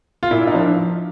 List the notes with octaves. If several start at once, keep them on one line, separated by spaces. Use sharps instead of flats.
F4
A#2 E4
D#4
F3 D4